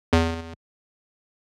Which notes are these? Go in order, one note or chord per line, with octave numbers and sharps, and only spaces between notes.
E2